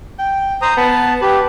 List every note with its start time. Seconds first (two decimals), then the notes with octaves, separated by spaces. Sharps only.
0.19 G5
0.62 C5 A#5 D#6
0.77 B3 A5
1.22 G4 B4